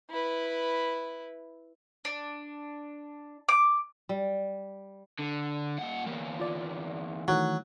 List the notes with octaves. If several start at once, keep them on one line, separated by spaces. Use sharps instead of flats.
E4 B4
D4
D6
G3
D3
A#2 F#5
E2 A#3
F4 D5
D#3 E3 F#3 A3